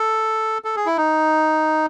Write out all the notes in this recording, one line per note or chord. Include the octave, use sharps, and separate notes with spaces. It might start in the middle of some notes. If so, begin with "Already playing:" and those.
Already playing: A4
A4
G#4
E4
D#4